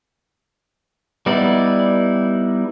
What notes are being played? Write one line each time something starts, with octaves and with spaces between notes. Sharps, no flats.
G3 B3 D#4 E4 D5